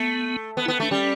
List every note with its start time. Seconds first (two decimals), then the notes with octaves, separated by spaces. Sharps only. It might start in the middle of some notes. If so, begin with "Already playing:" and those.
Already playing: A3 B3
0.57 B3
0.65 E4
0.68 B3
0.80 A3 D4
0.91 G3 C#4